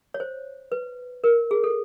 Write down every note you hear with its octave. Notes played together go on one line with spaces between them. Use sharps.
C#5
C5
B4
A#4
G#4
A4